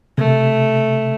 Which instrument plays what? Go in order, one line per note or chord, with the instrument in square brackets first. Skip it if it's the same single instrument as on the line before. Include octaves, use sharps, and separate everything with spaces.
[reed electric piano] C3 [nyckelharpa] A3